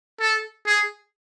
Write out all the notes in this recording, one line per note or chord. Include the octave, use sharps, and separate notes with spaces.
A4
G#4